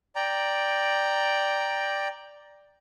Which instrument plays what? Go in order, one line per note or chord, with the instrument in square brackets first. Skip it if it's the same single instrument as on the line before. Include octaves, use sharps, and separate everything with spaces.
[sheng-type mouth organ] D5 G5 A#5